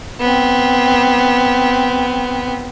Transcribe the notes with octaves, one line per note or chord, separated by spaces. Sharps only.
B3 C4